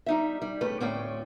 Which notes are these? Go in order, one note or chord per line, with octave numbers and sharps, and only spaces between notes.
G3 D#4 E5
G3
E2 A3 C#4 G4 B4
D2 A2 C4 C#4 D5 G5